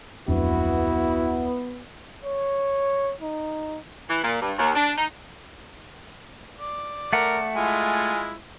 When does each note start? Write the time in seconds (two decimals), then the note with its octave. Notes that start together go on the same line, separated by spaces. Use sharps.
0.28 D1 F2 B3 D4 E4 F#4
2.24 C#5
3.21 D#4
4.09 E3
4.24 A#2
4.41 G2
4.58 D#2
4.75 D4
4.97 D#4
6.58 D5
7.13 A3 A#4 F#5
7.56 G#3 E4 F4 G#5